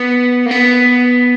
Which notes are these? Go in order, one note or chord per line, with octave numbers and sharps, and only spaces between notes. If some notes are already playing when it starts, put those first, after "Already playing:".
Already playing: B3
A#3
B3